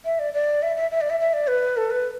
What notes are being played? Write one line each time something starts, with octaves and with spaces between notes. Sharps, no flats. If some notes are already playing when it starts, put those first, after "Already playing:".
E5
D5
D5
E5
E5
E5
D5
E5
E5
D5
B4
A4
B4